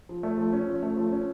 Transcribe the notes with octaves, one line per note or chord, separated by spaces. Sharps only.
F3
A3
F3
C#4
F3
A3
F3
C#4